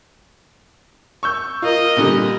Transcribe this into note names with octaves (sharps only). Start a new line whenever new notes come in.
C#6 E6 G6
F4 A#4 D#5
A#2 D3 G3